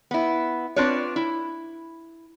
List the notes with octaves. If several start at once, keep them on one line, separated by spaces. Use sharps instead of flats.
B3 E4
C4 D4 F4 B4 C#5
E4